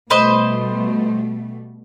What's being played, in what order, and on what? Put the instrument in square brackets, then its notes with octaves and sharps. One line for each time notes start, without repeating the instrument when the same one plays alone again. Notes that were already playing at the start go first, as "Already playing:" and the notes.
[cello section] B2 G3 A3 [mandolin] B4 C5 D#5